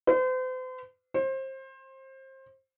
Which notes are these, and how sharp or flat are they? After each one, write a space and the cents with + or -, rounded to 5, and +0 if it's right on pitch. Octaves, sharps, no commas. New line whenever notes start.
C5 -40
C5 +25